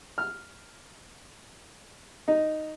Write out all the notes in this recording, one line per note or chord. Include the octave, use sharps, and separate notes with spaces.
F6
D#4